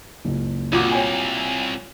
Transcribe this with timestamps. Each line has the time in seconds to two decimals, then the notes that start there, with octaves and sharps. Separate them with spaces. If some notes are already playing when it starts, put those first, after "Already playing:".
0.25 F#1 C#2
0.73 C2 A#2 F#4 D6
0.92 C#5 G5 G#5